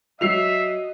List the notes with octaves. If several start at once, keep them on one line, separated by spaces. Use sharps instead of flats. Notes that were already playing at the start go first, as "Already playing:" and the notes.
F#3 F#4 D#5 E5 C7 F7